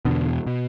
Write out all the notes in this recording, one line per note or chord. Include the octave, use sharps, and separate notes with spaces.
E2 B2 D3
B2